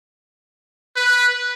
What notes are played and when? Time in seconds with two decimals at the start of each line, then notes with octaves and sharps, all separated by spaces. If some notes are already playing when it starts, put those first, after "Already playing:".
0.96 B4